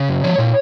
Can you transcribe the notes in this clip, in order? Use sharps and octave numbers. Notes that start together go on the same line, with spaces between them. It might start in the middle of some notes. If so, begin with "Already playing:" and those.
Already playing: C#3
F#2
F3 C#5
A#2